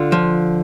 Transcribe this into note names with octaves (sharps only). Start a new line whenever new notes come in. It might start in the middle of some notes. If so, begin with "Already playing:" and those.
Already playing: D3 F4
F3